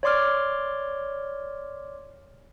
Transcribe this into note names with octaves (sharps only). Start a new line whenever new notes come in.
C#5 D5 C6 D6 F6